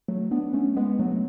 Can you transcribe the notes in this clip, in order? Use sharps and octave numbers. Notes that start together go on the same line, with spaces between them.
F#3 A3
B3 D4
A3 C#4
G#3 B3
F#3 A3